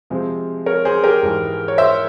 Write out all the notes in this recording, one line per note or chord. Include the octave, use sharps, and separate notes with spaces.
C3 F3 G#3 C4
A#4 C#5
G#4 C5
G4 A#4
G#2 E3 G#3
C#5
C5 E5